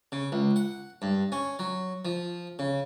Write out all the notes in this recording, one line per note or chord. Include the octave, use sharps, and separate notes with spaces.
C#3
C#2
F#5
G2
C#4
F#3
F3
C#3